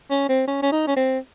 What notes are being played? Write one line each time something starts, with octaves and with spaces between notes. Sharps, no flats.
C#4
C4
C#4
C#4
D#4
C#4
C4